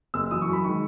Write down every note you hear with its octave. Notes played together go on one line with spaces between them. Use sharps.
F#1 E6
F#2 E3 D#6
C#6
F#2
B5
D#3 G#3 C#6